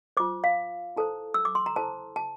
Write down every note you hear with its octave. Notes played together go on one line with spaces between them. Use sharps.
F4 C5 D6
F5
E4 A4 C5 A5
E6
D6
C6
A#5
E4 A4 C5 A5
A5